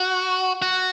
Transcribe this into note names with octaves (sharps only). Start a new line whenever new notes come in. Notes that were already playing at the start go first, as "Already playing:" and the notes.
Already playing: F#4
F#4